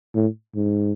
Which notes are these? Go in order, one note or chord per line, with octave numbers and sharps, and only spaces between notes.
A2
G#2